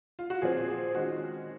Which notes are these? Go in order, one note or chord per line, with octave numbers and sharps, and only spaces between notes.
F4
F#4
A#2 F3 C4 G#4
G#4
D#3 G#3 C#4 F#4